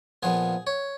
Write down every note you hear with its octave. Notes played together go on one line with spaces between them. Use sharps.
A#2 F3 B3 G#4
C#5